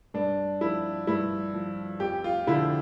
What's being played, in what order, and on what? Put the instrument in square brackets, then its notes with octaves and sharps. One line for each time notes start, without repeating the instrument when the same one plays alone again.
[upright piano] G2 D4
F3 E4
G2 E4
F3
F2 G4
F4
D3 F3 E4